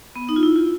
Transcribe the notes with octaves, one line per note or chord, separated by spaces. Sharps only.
B3
D#4
F4
E4
F4